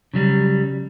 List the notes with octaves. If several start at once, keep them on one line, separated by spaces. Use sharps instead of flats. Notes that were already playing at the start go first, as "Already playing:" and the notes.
C#3 F#3 G3